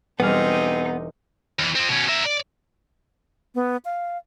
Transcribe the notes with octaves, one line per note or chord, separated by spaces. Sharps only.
E1 G3 B3 C4 D#4 G4 G#4 F6
D#2 E3
F3 C4
B2 C#4
A#4 E5
D5
B3
F5